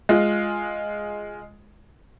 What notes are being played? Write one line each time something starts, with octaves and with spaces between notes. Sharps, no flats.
G#3 F4